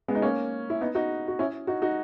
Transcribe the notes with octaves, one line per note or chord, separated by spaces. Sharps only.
G#3 B3
D#4
A#3 C#4
E4
B3 D#4
D#4 F#4
F#4
C#4 E4
D#4 F#4
D#4 F#4